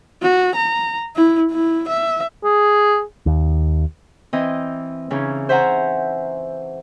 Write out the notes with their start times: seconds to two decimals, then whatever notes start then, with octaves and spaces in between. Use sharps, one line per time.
0.22 F#4
0.55 A#5
1.16 E4
1.52 E4
1.88 E5
2.44 G#4
3.26 D#2
4.33 E3 C4 D#5
5.10 C#3 E3 C#4 D#4
5.49 C5 E5 F#5 G#5 A#5